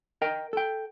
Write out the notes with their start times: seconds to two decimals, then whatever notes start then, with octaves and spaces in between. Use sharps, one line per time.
0.22 A#4 D#5 G5
0.53 A4 G5